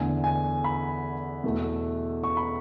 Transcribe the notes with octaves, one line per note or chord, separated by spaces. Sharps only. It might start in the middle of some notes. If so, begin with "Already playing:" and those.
Already playing: E2 D3 A3 G#5
G#5
B5
E2 B2 A3
C#6
B5